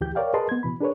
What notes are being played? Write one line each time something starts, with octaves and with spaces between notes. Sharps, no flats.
D2 E3 G4 G6
A#4 C#5 D5 F5 G5
G#4 A#4 B4 D#5 A5 C6
B3 G#6
B2 E3 B5
D4 G#4 A#4 B4 C#5